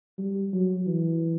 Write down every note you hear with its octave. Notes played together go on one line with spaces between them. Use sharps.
G3
F#3
E3